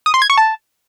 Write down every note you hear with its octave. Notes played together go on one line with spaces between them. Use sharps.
D#6
C6
G#6
C#6
A5